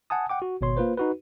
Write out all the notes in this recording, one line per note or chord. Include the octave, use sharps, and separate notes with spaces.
F#5 G#5 A5 D#6
F#5 G5 D6
F#4
G#1 B2 C#5 C6
A#3 F4 B4 C5
D#4 F#4 B4